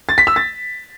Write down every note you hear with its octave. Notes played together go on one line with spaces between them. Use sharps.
A6
B6
E6
A6